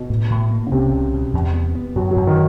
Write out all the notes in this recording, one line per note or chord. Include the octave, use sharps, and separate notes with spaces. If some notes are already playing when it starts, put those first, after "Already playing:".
Already playing: B2
A2
A2
A#3
C#3
C2 C3
C2
B2
E2
B3
B3
F#2 F#3
F#3
F#2
D#3